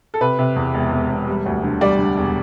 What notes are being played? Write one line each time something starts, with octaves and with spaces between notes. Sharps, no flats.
A4
C3 B4
C3
E2
E1
E1
E1
G3
D2
D3
G3 D5
D3
E1